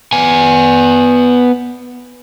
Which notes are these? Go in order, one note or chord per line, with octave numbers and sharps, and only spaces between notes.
B3 G#5